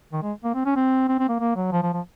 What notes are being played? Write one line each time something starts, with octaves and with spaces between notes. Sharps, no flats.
D#3
G#3
A#3
C4
C#4
C4
C4
C4
A#3
A#3
F#3
F3
F3
F3